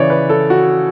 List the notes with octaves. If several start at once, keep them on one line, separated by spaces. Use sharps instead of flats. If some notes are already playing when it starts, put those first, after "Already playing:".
Already playing: C#3 E3 C#5 D5
B4
A4
F#4